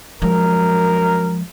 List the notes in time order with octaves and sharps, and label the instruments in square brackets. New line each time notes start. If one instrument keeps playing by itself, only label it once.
[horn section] F#2 A#4 [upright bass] F3 G#3